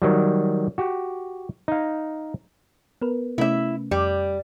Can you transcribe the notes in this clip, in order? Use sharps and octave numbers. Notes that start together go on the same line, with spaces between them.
D#3 F#3 G3
F#4 G4
D#4 F5
B3 A#4 B4
C3 A3 C#4 E4 E5
F2 G3